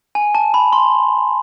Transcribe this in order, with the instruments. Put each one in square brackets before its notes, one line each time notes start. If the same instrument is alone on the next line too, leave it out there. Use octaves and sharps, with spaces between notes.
[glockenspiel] G#5
A5
B5
C6